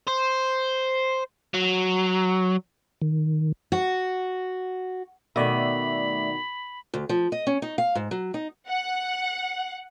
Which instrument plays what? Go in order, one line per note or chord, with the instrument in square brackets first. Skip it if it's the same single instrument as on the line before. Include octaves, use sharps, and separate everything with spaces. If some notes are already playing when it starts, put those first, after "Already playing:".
[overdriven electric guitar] C5
F#3
[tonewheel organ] D#3
[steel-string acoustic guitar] F#4
[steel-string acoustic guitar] B2 D#3 [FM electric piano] A3 D5 E5 [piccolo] B5
[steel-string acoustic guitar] D2
F3
D#5
C#4
D#4
F5
G#2
F#3
D#4
[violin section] F#5